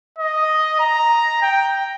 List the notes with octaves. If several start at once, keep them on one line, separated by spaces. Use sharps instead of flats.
D#5
A#5
G5